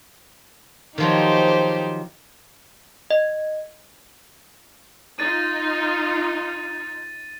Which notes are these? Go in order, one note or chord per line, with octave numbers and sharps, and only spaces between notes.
D#3 F3 F#3 D#4 G4 C5
D#5
D#4 F4 A6 D#7